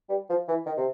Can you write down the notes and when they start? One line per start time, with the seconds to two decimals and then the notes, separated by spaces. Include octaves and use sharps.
0.09 G3
0.29 F3
0.48 E3
0.66 D#3
0.77 C3